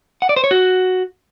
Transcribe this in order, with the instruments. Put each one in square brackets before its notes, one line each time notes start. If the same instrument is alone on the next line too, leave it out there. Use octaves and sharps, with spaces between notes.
[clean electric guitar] F#5
D5
C5
C#5
F#4